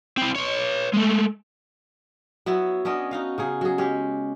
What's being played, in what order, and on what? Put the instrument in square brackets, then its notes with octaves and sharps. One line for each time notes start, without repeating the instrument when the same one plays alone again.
[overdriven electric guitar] C4 E4
B4 C#5
G#3 A3
[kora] F#3 B3 E4 F#4
B3 C#4 D4 D#5
D#4 F#4 F5
C#3 D#4 G#4
F#3 G#4
G#3 C#4 G4